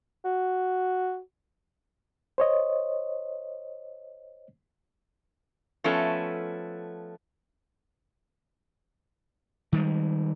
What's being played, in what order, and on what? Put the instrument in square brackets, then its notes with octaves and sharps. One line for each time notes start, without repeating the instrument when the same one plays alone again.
[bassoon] F#4
[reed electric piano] C5 C#5 D#5
[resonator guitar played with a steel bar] F3 A3 B3 C#4 A4
[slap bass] D#3 G3 G#3